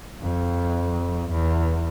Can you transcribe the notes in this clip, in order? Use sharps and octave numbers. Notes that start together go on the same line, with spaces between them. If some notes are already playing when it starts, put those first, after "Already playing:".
F2
E2